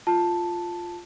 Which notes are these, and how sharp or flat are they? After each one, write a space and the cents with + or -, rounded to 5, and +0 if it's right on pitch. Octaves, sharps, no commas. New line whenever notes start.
F4 +0 A5 +0